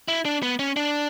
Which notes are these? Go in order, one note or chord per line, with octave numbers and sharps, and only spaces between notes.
E4
D4
B3
C#4
D4